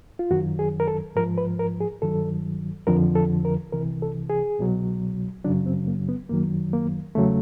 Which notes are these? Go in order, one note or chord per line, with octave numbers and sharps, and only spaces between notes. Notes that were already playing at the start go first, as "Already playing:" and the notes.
F4
F#2 D#3 F#3 F#4
G#4
A#4
A4
G#2 F3 A#4
B4
A#4
G#4
G2 D#3 F#3 A4
F2 D3 F3 A#4
A4
A#4
C2 C3 E3 A#4
A4
G#4
C2 B2 F#3
F#2 C#3 F#3 D4
C4
A#3
B3
F#2 D#3 F#3 A#3
A#3
E2 C#3 F#3 A3